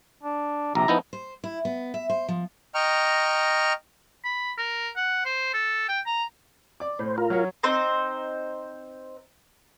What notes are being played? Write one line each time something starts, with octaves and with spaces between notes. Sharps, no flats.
D4
A#1 C3 A#5
F3 B3 D#4 E4
C5
E4
B3
E5
C5
F3
D#5 G5 A#5 C#6 F6
B5
A#4
F#5
C5
A4
G5
A#5
D5 D6
A2 C5
F4 A#4
F#3 C#5
C4 D#4 C5